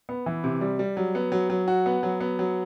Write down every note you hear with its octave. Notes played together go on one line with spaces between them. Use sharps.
B3
E3
C3
G3
G3
F#3
B3
F#3
F#3
F#4
B3
F#3
B3
F#3